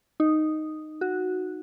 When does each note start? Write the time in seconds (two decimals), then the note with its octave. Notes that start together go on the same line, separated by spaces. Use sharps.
0.20 D#4
1.01 F#4